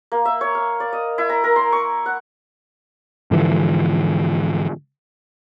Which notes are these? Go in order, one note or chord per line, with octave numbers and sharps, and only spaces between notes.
A#3
E5
C#5
F5
D5
D#5
E4
A#5
A#4
C6
C#6
F#5
G#2 D3 E3 F3